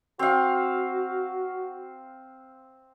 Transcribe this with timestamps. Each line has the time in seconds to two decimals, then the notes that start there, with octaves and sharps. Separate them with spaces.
0.19 C4 F#4 F5